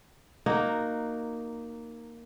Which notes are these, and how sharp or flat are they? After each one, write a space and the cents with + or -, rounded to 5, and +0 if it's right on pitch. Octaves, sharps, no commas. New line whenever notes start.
A#3 +0 D#4 -10 F#4 +0